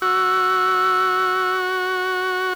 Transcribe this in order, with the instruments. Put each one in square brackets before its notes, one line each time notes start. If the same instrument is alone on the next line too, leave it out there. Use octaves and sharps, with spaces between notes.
[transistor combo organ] F#4 [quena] E6